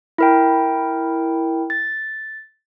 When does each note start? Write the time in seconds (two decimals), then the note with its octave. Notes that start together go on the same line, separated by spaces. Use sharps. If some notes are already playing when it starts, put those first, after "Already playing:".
0.18 E4 A#4 G5
1.70 A6